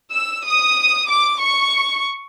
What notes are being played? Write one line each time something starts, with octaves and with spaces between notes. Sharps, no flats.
E6
D#6
D6
C#6